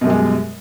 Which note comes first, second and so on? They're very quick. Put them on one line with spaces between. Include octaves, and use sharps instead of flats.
B2 F#2 G3 G#3